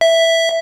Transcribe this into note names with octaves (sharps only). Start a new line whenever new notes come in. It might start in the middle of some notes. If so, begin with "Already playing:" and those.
E5